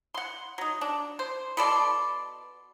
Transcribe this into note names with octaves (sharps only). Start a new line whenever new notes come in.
F#5 C6
F#3 D#4
D4
C5
B2 A4 D5 C6